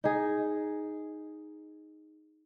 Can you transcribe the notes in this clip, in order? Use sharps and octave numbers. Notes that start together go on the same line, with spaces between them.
D#4 G#4